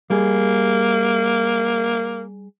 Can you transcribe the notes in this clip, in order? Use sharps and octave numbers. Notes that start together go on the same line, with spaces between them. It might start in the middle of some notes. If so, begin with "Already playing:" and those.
G3 A#3 G#4